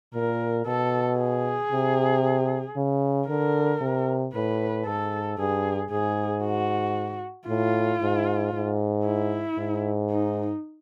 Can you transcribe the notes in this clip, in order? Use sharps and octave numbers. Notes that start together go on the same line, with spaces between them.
A#2 A#4
B2 A4
G#4
C3
C#3
D3 A#4
C3
A2 B4
G#2 A4
G2 G#4
G#2 G#4
F#4
A2 F4
G#2
G#2
E4
G#2
D#4